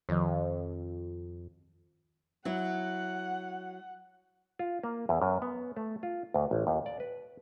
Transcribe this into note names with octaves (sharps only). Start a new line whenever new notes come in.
F2 D#3 F3
F#3 E4 F#5
F4
A#3
E2
F#2
B3
A3
F4
D2
A1
D#2
D5
B4